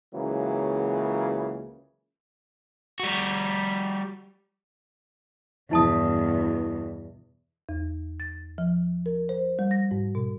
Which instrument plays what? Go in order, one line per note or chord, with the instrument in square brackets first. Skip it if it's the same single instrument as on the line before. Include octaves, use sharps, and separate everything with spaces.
[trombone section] C#2 C#3 E3 F#3 A#3
[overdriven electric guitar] G3 F#4
[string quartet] E2 G2 B2 [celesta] E4 A5 D#6
[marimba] E2
A6
F3
A#4
C5
G3
A#6
G#2
B2